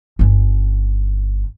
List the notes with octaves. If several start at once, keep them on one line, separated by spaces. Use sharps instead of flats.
G1 C#4